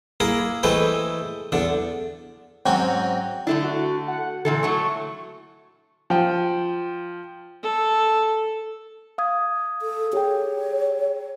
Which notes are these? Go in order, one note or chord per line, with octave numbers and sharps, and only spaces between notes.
A#3 E4 G#4 A#4
E3 G#3 A3 C4 E4 B4
E2 D3 D4
G#2 F#3 C4 C#4 G5
D3 A3 D4 E4
F#4
F#5
A#2 D3 E3 A4
F#3 A3 E4 C#6
F3 G5
A4
F5 D#6 G#6
A4
G4 G#4 C#5 G5